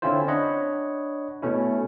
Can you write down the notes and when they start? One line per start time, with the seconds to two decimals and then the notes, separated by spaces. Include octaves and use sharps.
0.02 D3 C4 C#4 E4 F4 C5
0.28 D4 C#5 D#5 F#5 B5
1.42 B2 A3 C#4 E4